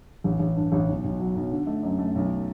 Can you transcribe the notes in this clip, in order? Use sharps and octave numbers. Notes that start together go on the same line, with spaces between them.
A1
A1
G2
A1
B1
B1
F#3
B1
D3
A3
F#2
A3
B1